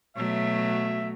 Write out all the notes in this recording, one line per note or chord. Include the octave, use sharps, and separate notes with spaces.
B2 F#3 A3 C#5 E5